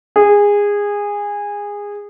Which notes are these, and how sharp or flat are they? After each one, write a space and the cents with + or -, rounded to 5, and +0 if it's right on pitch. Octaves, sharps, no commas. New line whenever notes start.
G#4 -20